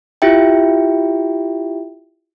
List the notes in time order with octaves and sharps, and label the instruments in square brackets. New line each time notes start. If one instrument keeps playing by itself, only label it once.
[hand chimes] E4 F4 G4 E5 G5